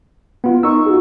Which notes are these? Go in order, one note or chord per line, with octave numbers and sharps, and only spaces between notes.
B3 F4
D#4 A#4 D#5 C#6 E6
F4 F#4 G#4